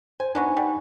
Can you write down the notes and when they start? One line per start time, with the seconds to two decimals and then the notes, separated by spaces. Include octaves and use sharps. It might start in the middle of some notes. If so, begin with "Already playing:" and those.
0.20 C5 G#5
0.35 F#3 B3 D4 D#4 G#5 C#6
0.57 G3